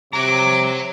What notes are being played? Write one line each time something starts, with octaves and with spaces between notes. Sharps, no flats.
C3 C#5 A#5 D6